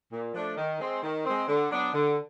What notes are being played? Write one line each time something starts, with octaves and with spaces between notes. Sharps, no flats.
A#2
F3 A3 D4
D#3
G#3 C4
D#3
G#3 C4
D3
F#3 B3 D4
D3